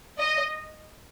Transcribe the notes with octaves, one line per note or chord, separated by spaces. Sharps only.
D#5